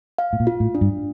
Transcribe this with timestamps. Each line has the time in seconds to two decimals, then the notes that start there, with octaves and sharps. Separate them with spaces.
0.18 F5
0.33 A2
0.40 A#2
0.47 F4
0.60 A2
0.75 D4
0.81 G2